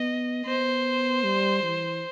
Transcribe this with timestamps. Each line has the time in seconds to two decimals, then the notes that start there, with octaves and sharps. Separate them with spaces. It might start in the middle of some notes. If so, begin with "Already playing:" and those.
Already playing: B3 D#5
0.46 B3 C5
1.24 G3
1.63 E3